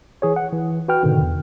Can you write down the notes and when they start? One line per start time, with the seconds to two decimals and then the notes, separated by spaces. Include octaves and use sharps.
0.22 E3 G#4 C#5
0.36 F#5
0.53 E3
0.88 F#4 B4 G5 F6
1.03 G#2 B2 D3 D#3
1.21 E2